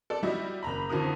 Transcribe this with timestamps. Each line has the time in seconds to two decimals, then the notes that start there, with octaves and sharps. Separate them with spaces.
0.10 A4 D5
0.23 G3 E4 F#4 D#5
0.63 F#1 A#5 B5
0.90 F2 D3 E3 F#4 A#4 D#6